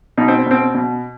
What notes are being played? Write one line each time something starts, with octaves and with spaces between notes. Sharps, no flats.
B2 D#4
C4
B2 C4
B2